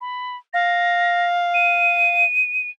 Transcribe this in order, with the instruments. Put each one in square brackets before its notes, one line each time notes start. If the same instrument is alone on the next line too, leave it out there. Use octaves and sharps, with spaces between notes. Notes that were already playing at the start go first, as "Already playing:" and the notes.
[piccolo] B5
[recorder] F5 [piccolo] A#6
[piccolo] D#7